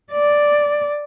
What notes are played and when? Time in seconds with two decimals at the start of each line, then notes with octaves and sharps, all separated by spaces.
0.12 D5